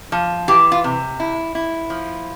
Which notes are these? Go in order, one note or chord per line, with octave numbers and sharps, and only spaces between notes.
F3
E3 G4
F4
C3
E4
E4
F3